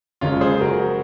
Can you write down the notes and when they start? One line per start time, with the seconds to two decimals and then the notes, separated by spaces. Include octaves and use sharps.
0.21 F#1 F#2 F3 G#3 C#4 F4
0.41 G#4 C5
0.61 F#4 A#4